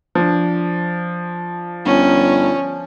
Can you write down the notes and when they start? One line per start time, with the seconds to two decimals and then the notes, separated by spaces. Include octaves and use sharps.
0.15 F3 D4
1.85 G1 C#4